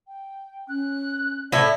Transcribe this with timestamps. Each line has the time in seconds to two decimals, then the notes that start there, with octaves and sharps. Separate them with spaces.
0.08 G5
0.69 C#4 F#6
1.52 A2 E4 D5